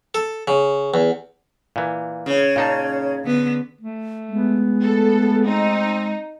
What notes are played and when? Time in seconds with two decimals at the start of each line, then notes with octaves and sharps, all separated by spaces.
0.14 A4
0.48 C#3
0.94 E2
1.76 A#2 E3
2.26 C#3 C#5
2.56 A#2 D#4 A5
3.24 D3 B3
3.81 A3
4.29 G#3 B3
4.82 A3 A4
5.46 C4 D#4